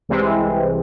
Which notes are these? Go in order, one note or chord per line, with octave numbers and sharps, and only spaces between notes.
C2 C3 E3 G#3 C4